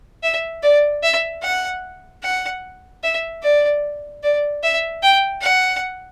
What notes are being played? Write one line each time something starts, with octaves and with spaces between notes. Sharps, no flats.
E5
D5
E5
F#5
F#5
E5
D5
D5
E5
G5
F#5